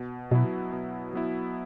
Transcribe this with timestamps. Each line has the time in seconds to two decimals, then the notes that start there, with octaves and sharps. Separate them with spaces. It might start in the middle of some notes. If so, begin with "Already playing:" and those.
Already playing: B2
0.31 B2 F#3 B3 E4
0.73 B2
1.13 F#3 B3 E4